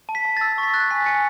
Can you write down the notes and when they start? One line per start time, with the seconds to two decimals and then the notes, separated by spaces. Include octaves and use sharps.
0.09 A5
0.15 B6
0.25 A5
0.37 E6 A6
0.58 C#6
0.63 B6
0.74 F#6 A6
0.90 G#5 B6
1.06 G#5 C#7